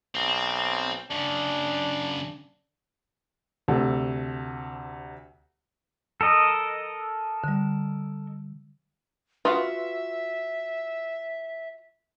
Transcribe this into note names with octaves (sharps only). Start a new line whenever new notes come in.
B1 C4
F#2 C#3 D4
D2 C3 A4
A4 A#4 D#5
D3 G3
F4 F#4 B4 E5 F5 C6 D#6